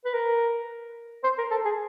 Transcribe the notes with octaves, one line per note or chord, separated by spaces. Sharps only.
B4
A#4
C5
A#4
A4
G#4